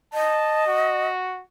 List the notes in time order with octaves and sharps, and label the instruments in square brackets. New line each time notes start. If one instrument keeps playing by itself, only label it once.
[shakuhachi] D#5 [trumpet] A5
[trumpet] F#4